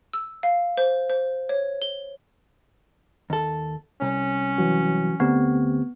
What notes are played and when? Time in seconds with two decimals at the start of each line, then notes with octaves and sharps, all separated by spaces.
0.13 E6
0.43 F5
0.77 C5
1.10 C5
1.49 C#5
1.82 G7
3.30 D#2 A4
4.02 C2 C#4
4.58 E3 F#3 F#4
5.20 D2 A3 B3 C4 G4